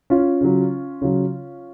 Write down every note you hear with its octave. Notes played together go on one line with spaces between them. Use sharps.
C#4 F4
C#3 F#3
C#3 F#3